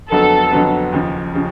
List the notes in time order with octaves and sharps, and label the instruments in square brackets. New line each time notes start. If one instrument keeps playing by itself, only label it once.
[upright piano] F2 D3 F#3 B3 [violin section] A4
[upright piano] F2 D3 F#3 B3
D#2 C#3 F3
C#3 F3